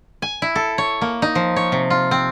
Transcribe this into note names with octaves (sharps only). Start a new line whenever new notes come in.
G#5
E4
A4
C#5
A#3
D#4
F3
C#5
C3
F4
C4